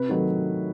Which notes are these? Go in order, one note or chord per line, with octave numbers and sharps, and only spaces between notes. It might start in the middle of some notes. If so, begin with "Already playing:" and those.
Already playing: C3 B4
D#3 F#3 A3